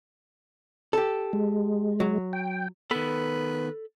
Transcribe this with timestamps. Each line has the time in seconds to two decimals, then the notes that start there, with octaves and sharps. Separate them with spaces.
0.93 G4 A4
1.33 G#3
2.00 F#3
2.33 G5
2.91 D#3 B3 A4 B4 B5